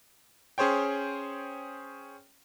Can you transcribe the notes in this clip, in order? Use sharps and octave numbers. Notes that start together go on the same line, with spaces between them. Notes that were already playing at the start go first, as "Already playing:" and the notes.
C#4 G#4 C5 C#5 G5